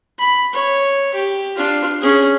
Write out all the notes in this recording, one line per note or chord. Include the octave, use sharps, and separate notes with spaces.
B5
C#5
G4
D4 F4
C#4 G#4